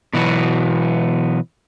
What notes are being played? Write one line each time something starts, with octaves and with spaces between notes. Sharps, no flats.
B2 E3 F#3 B3